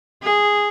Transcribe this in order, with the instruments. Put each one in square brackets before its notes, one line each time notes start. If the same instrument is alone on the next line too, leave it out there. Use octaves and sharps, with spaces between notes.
[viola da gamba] G#4